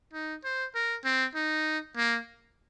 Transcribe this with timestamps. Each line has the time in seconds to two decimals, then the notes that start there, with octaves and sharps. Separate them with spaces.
0.13 D#4
0.44 C5
0.75 A#4
1.05 C4
1.36 D#4
1.97 A#3